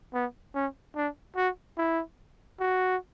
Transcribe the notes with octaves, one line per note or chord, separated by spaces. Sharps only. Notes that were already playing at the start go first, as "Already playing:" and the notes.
B3
C#4
D4
F#4
E4
F#4